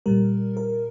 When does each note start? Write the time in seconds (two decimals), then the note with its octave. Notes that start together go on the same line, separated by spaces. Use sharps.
0.06 A#2 G3 A#4
0.57 A#4